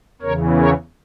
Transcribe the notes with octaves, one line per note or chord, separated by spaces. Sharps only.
E2 C#3 E3 A#4 C#5
A#4 C#5